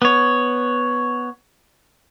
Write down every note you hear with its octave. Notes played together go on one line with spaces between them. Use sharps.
B3 C#5